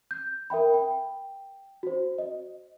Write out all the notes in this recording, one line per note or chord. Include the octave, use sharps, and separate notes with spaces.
G6
A#4 E5 G5 B5
G5
F#4 C5
D#5